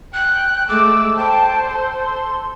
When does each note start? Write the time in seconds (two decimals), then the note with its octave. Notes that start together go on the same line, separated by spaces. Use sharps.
0.14 G5 F#6
0.69 G#3 A3 D6 E6
1.17 C5 G5 A5
1.69 A4 C6